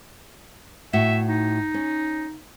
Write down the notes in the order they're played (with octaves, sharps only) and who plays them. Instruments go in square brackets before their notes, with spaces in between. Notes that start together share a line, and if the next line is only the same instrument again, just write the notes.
[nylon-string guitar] A2 F#4 [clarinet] E5
[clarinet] D#4
[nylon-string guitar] C#4